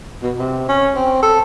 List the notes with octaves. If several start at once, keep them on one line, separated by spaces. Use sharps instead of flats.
B2
C3
C#4
C4
A4